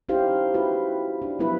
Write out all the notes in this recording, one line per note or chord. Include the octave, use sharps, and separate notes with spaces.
C#4 D#4 E4 G4 C5 F5
E4 F#4 B4
D4
F3 F#3 B3 D4 E4 B4